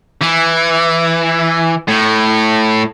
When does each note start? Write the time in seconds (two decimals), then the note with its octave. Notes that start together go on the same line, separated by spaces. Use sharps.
0.22 E3
1.88 A2